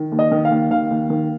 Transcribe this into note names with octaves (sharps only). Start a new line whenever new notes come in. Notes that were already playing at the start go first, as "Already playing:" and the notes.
Already playing: D#3
D#2
D#5
D#3
F5
D#2
D#3 F5
D#2
D#3